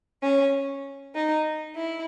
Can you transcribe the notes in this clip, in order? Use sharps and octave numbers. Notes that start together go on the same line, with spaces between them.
C#4
D#4
E4